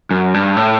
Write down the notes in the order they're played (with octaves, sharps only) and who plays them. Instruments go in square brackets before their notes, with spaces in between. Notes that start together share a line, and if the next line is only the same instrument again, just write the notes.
[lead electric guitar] F#2
G2
A2